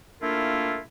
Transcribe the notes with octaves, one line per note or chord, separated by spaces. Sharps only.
A3 A#3 D4 E4 F4 A#4